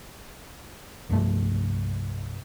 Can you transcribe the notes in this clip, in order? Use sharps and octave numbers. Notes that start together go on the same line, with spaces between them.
C2 G2 F3 A3